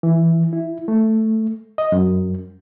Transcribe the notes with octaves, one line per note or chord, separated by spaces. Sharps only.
E3
E4
A3
D#5
F#2